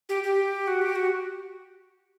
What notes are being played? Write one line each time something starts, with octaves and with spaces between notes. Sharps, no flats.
G4
G4
F#4
G4
F#4